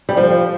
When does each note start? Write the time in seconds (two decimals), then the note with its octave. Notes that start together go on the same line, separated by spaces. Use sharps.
0.09 G3
0.17 F3